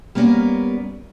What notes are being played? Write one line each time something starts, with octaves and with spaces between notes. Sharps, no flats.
G3 A#3 B3 C#4 A#4 D5